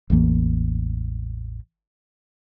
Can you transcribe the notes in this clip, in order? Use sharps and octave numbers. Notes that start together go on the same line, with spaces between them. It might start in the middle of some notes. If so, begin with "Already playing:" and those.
A1 E2 E3 A#3